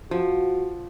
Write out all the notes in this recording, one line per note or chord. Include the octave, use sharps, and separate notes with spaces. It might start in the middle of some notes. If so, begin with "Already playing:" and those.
F3 F#4